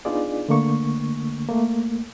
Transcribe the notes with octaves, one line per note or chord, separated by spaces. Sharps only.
B3 D4 D#4 F4 G#4 D5
D3 A3 A#3 C#6
A3 A#3